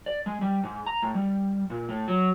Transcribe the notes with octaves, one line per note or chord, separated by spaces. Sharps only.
D5
G#3
G3
G#2
A#5
A2
G3
A#2
A2
F#3